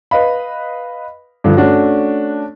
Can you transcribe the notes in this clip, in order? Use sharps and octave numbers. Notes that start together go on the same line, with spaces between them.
B4 D#5 F5 B5
G2 D3 F3
A3 C#4 D4 F#4